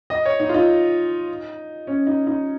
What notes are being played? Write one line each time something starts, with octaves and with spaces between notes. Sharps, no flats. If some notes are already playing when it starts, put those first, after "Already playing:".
D#5
C#5
D#4
F4
D#4
C#4
D#4
D#4